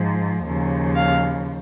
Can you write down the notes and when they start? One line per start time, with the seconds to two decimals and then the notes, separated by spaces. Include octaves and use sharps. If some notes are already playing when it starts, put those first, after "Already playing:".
Already playing: G#2 F3
0.45 D#2 C#3 F3
0.95 F5